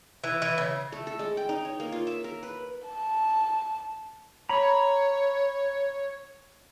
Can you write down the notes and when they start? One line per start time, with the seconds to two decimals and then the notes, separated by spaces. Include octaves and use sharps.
0.24 E3
0.42 E3
0.58 C#3
0.92 A3
1.07 A4
1.19 G#3
1.37 G5
1.49 D#4
1.65 C#5
1.80 A#3
1.92 F4
2.07 E5
2.24 A#4
2.43 B4
2.88 A5
4.49 C#5 A#5 B5